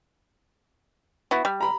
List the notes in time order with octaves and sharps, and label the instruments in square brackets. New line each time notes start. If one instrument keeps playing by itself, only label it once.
[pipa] B3 E4 F#4
G3
[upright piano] A#5 B5